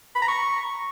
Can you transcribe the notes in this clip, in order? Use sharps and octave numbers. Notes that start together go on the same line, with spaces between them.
B5
A#5
C#6